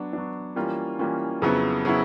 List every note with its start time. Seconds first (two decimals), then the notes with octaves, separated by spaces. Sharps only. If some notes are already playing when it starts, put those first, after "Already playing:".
Already playing: F#3 B3 D4
0.13 F#3 B3 D4
0.56 E3 G3 A#3 C#4 F4
0.99 E3 G3 A#3 C#4 F4
1.42 F2 C#3 F#3 B3 E4
1.85 C#3 F#3 B3 E4